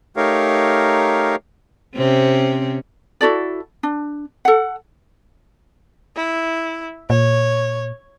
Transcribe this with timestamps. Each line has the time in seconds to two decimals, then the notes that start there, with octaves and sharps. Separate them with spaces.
0.17 A3 D#4 G4 A#4 C#5 F5
1.96 C3 C4 C#4
3.21 E4 F#4 A4 D5
3.83 D4
4.45 A4 F#5
6.16 E4
7.10 A#2 C#5